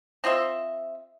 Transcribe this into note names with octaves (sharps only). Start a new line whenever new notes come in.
C4 F4 D#5 E5